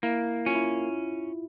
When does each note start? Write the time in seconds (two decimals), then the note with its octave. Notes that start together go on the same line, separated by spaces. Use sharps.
0.03 A#3 E4
0.46 C#4 F4
0.55 E4